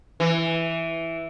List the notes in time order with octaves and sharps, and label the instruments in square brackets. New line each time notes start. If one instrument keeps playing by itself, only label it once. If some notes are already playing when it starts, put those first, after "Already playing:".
[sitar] E3